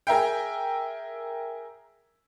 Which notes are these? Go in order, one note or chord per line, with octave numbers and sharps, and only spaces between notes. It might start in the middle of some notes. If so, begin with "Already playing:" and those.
G#4 A#4 E5 G5